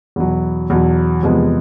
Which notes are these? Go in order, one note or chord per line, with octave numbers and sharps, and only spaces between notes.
E2 B2 F#3
E2 B2 F#3
E2 C3 F3 G#3 B3